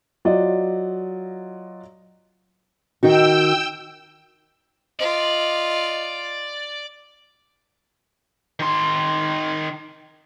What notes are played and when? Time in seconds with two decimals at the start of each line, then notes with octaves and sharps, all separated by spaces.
0.25 F#3 F4 D5 D#5
3.03 D#3 D#4 F#4 G5 E6
5.00 F4 D5 D#5
8.60 D#3 C6